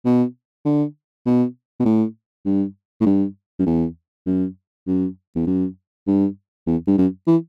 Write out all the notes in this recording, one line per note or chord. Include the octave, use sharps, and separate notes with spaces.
B2
D3
B2
B2
A2
G2
A2
G2
F#2
E2
F#2
F#2
E2
F#2
G2
E2
G2
F#2
E3